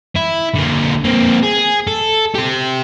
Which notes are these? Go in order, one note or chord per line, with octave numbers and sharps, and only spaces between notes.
E4
D3 A#3
A#3 C4
G#4
A4
G4 C5